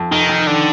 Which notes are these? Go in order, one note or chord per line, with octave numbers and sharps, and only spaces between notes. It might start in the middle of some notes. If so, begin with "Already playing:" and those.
Already playing: F2
F1 D#3
F1
D3 D#3